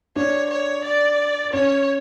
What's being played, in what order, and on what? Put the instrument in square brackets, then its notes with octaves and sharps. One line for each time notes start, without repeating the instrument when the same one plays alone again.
[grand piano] D4 [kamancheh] C#5
[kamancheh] C#5
D5
[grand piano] C#4 [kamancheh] C#5